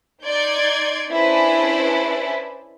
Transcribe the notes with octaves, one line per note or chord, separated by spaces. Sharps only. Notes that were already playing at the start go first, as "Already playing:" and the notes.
D#4 D5 C6 G6 G#6
C#4 D4 E4 G#4 B4 C5